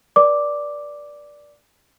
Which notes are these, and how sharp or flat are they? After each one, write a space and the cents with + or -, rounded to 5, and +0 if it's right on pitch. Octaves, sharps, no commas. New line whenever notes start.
B4 -45 D5 +0 D6 +0